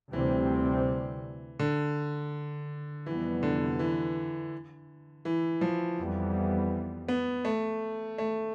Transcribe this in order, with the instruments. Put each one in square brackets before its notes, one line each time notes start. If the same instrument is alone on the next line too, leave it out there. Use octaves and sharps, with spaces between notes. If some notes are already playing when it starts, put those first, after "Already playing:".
[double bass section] D2 C3 G3 C4 [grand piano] E3
[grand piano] D3
[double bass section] F2 C3 G3 B3 [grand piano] E3
[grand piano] D3
E3
E3
F3
[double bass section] F2 E3 G3 B3
[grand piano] B3
A3
A3